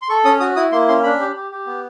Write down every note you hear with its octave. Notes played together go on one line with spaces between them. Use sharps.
C6
A4 C#6
C#4 D#6
F#4 D#6
E4 D#6
A#3 C6
C#4 C6
D4 B5
G4
G4
G4
B3